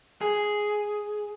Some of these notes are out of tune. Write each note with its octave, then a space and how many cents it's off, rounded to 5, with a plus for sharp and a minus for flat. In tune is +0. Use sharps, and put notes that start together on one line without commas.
G#4 +5